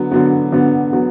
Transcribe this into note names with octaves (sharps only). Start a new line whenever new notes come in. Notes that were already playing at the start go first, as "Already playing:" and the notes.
Already playing: D3 F#3 B3
D3 F#3 B3
D3 F#3 B3
F#3 B3